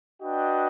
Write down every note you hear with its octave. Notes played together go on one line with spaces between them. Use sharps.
D4 F#4 B4 D#5 G5